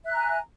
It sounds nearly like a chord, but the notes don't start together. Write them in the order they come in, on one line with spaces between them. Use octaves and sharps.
E5 F#6 A#5 G#5